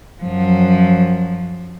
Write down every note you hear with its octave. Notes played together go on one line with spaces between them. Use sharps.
F#2 F3